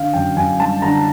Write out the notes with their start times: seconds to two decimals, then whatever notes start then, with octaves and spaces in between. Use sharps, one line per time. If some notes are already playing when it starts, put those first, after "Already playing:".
Already playing: D3 F5
0.13 F#2 G5
0.36 F#2 G#5
0.59 G3 A5
0.82 D3 A#5